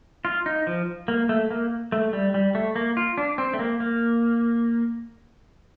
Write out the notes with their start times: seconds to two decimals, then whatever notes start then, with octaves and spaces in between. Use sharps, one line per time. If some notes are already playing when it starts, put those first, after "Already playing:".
0.25 F4
0.46 D#4
0.67 F3
1.08 A#3
1.29 A3
1.51 A#3
1.92 A3
2.13 G3
2.34 G3
2.55 A3
2.76 A#3
2.97 F4
3.18 D4
3.38 C4
3.54 A3
3.59 A#3
3.80 A#3